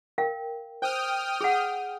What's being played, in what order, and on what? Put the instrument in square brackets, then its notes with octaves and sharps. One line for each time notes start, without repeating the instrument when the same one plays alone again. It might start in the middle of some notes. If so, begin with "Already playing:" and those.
[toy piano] A#4 F5 G5
[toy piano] C5 [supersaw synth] G5 D#6 F6
[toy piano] G#4 F#5